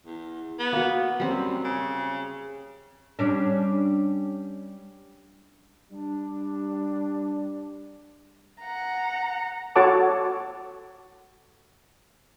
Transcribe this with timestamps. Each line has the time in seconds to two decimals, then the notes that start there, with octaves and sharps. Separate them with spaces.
0.06 E2
0.59 B3
0.73 A#3 F#4
1.20 F#2 G3 C4
1.64 C#3
3.19 G3 C#4 D4
5.92 G3 D4
8.61 F#5 A#5
9.76 F#4 A4 C#5 F#5 A5 D6